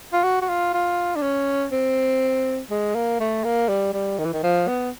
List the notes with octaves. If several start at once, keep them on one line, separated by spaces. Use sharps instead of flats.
F4
F#4
F#4
F4
F4
D4
C#4
C4
G#3
A#3
A3
A#3
G3
G3
D#3
E3
D#3
F3
B3